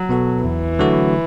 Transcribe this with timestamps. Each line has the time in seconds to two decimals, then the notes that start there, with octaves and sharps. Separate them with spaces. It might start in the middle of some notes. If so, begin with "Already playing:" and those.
Already playing: F#3
0.09 B2 B3 F#4 A4
0.44 E2 E3
0.79 D3 F#3 A3 F#4